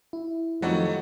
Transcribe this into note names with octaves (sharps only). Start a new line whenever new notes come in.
E4
F2 D#3 F#3 G3 A3 D#5 F#5